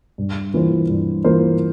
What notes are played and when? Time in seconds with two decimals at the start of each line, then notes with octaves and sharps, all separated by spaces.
0.18 G2
0.54 E3 A#3 F4 C5
0.90 G2
1.24 E3 A#3 F4 C5